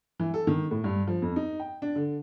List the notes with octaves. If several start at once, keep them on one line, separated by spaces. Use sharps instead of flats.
E3
A4
D#3
A2
G2
F3
F2
D#4
G5
D4
D3